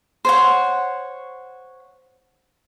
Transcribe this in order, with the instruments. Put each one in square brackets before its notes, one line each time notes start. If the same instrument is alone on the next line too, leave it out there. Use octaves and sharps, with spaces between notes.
[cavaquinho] C5 C#5 F#5